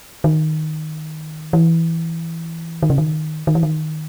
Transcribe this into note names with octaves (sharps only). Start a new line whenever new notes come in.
D#3
E3
D#3
C#3
D#3
D#3
E3
D#3